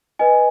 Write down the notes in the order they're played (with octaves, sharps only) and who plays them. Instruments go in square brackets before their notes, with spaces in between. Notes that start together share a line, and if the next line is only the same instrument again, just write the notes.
[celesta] B4 D#5 G#5